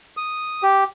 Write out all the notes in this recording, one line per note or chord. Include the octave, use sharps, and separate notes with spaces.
D#6
G4